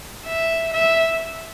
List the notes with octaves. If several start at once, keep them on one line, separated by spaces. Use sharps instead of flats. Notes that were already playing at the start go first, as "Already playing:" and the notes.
E5
E5